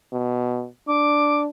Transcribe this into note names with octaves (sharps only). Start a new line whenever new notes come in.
B2
D4 D6